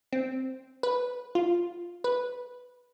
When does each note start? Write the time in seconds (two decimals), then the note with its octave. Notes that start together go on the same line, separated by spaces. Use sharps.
0.12 C4
0.83 B4
1.35 F4
2.04 B4